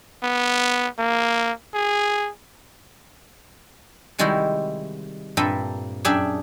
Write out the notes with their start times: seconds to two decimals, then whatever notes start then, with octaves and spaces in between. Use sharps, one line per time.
0.23 B3
0.99 A#3
1.74 G#4
4.18 C3 D#3 G3 G#3 E4 F#4
5.37 G2 A#2 C4 A4 E5 B5
6.05 F#2 D4 G#4 E5 G5